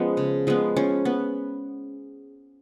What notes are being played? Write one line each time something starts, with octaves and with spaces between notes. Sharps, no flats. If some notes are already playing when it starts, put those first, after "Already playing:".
Already playing: F3 G#3 B3 C#4
C#3
F3 G#3 B3
F3 C#4
B3